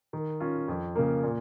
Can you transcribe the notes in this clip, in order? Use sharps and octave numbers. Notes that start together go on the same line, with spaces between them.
D#3
C#4 F4
F2
C#3 A#3
A#2